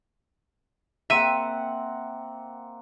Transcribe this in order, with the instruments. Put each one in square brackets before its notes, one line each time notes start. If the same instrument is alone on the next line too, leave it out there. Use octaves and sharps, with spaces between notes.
[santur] A#3 C4 F#5 [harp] E5 D#7